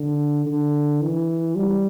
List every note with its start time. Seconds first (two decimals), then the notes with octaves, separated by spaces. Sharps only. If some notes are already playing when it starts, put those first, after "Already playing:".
Already playing: D3
0.46 D3
1.01 E3
1.56 G3